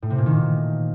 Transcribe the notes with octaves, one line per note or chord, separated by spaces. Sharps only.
A2
C3
A#2
D#3